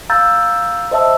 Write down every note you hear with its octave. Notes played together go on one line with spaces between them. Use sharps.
F5 A#5 E6 G6 A6
C5 D#5 E5 A5 E6